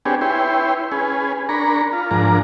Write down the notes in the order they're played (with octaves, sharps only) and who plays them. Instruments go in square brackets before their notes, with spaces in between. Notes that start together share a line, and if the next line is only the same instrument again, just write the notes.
[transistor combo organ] C4 D4 G4 G#4 B4 C#5
E4 B4 C#5 G5 C6
C#4 G#4 B4
D4 A#4 A#5 B5 C#6
F4
G#2 F3 D4 A#4 A#5